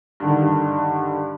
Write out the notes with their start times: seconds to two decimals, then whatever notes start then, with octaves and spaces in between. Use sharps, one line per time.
0.20 G2 D3 D#3